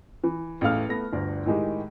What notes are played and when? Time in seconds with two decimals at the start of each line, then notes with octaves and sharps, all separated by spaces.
0.24 E3
0.61 A1 E2 A3 F5 F6
0.89 A3 B3 A#6
1.12 G1 D2 D4 D5
1.46 A2 D#3 G#3 G4